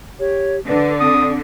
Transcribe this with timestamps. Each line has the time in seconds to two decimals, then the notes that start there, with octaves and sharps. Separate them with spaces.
0.19 G4 C#5
0.68 D3 B4 D5
1.00 C4 D#6